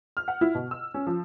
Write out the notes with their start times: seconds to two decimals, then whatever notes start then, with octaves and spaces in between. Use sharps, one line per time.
0.17 F6
0.28 F#5
0.41 E4
0.55 B2
0.71 E6
0.94 C#4
1.07 F3